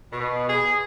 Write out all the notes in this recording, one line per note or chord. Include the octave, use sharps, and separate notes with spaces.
B2
G#4